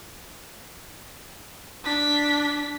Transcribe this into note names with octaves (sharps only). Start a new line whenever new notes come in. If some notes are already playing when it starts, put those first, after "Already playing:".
D4 B6